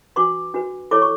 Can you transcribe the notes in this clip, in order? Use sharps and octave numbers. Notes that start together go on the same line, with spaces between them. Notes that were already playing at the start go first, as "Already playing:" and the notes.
D4 F#4 B4 C6 D6
D4 F#4 B4
E4 A4 C#5 C6 D6
C#6